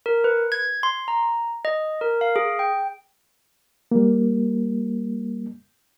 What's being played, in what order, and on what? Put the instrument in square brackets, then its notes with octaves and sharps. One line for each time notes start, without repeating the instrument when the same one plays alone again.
[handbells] A#4
B4
G#6
C6
A#5
D#5
A#4
F5
G#4
G5
[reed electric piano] G3 A#3